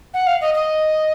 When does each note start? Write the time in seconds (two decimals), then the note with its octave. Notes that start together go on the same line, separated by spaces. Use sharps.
0.14 F#5
0.27 F5
0.41 D#5
0.54 D#5